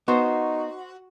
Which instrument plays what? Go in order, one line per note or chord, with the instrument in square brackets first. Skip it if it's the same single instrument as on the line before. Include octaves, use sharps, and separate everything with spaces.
[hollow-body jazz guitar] B3 [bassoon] D#4 [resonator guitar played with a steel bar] F#4 [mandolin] C5 C#6 D6